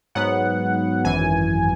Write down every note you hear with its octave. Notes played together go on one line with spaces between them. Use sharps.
G#2 F#3 B3 F#5
G#1 F#2 E3 G#5